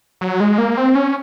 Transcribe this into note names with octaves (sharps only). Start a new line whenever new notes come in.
F#3
G#3
A#3
C4
C#4